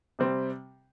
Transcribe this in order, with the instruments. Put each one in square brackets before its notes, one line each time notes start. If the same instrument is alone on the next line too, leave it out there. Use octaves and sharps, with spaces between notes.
[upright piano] C3 G3 C4